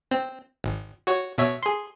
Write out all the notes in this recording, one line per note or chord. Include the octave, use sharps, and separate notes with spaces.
C4
G#1
F#4 C#5
B2 C#5 E5
G#4 C6